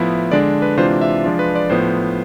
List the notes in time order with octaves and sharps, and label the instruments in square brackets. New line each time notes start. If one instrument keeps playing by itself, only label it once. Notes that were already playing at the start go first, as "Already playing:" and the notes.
Already playing: [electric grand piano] A2 F3 B3 E4
D3 G#3 D4 D5
B4
C3 E3 G#3 D4 F4 C5
E5
F3 G#3 D4 F4
B4
D5
A2 F3 B3 C5